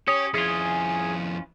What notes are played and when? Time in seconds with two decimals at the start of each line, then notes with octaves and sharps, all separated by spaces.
0.08 C#4 G4 C#5 D#6
0.34 F2 C#4 E4 F4 G#4